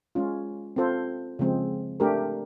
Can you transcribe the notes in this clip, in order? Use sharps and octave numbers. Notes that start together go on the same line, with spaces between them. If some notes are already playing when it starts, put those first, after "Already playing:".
G#3 C#4 F4
C4 F4 A4 C5
C#3 F3 G#3 C4
A3 D4 G4 A#4